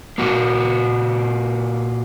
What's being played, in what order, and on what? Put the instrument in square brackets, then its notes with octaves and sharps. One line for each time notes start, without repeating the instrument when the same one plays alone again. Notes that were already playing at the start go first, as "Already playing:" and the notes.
[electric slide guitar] A#2 A#3 F#4